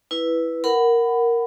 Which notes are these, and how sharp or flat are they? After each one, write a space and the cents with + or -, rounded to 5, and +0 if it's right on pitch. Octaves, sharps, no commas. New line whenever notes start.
E4 +0 B4 +0
A#4 +0 F#5 +5 B5 +15